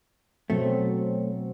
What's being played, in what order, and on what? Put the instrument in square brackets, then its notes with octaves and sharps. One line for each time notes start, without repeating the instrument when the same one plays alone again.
[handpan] B2 F#3 C4 [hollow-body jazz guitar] A3